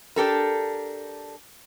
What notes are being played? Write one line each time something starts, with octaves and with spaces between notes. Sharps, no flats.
D4 G4 A4 A#4